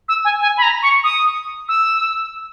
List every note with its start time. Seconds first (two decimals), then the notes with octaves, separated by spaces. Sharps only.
0.09 E6
0.25 G#5
0.41 G#5
0.57 B5
0.63 A#5
0.83 C#6
1.04 D#6
1.68 E6